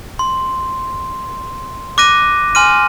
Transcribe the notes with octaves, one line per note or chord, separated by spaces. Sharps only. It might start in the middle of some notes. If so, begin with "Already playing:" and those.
C6
D6 F#6 A#6 D#7
G#5 C6 F6 D#7